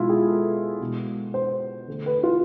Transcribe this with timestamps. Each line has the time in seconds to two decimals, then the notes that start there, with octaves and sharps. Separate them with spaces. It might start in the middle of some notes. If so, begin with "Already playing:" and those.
Already playing: B2 G#3 E4 F4
0.09 G#4
0.27 A4
0.80 B2 G#3
1.34 C5
1.87 D3 A3
2.06 B4
2.23 F4